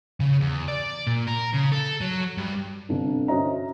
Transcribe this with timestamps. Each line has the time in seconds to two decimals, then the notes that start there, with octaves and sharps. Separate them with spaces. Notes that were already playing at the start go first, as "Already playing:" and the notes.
0.20 C#3
0.41 E2
0.68 D5
1.07 A#2
1.27 A#4
1.53 C#3
1.72 A4
2.01 F#3
2.37 G2
2.89 G1 C3
3.28 C#4 F#4 C5 D#5 E5 A#5